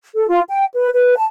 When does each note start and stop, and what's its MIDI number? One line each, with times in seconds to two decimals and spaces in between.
0.16 0.27 69
0.28 0.40 65
0.48 0.65 79
0.73 0.88 71
0.92 1.14 71
1.17 1.25 81